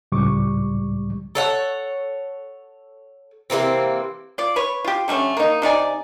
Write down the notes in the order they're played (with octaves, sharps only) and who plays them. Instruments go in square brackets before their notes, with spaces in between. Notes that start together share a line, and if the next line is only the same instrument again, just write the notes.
[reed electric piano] C#2 A2 G3 C#6 D6
[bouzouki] A4 C#5 F#5
C3 E3 A#3 C4
[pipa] F4 D5
B4 C#5
F4 G4
D3 G3 A3 C#4
A#3 D#4
C3 D#4 D5 G#5